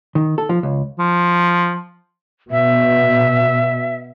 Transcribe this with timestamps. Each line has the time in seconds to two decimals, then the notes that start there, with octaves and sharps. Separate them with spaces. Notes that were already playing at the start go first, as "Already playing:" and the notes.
0.15 D#3
0.38 A4
0.49 F3
0.63 C#2
0.99 F3
2.51 B2 E5